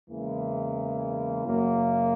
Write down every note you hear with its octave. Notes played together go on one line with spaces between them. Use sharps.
E2 C#3 E3 G#3 A#3
F#2 C#3 F#3 A#3